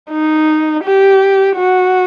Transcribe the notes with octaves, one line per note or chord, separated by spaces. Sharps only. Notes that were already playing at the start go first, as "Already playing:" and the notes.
D#4
G4
F#4